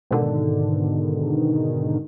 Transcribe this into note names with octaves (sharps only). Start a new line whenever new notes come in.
G#2 B2 D3 D#3